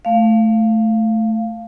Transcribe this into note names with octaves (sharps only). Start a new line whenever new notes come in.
A3 F5